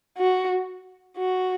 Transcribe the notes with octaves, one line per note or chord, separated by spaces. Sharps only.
F#4
F#4